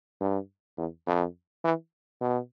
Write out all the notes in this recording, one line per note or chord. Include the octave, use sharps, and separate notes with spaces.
G2
E2
F2
E3
B2